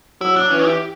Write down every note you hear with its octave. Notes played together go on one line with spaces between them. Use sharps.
F#3 E4
D4
E3 C#4
G4